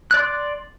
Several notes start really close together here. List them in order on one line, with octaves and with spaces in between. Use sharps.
F#6 D5 C6 D6